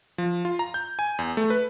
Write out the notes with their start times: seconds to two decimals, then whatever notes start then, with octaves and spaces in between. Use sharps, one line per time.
0.18 F3
0.45 F4
0.59 A#5
0.74 G6
0.99 G#5
1.19 E2
1.37 A3
1.50 B4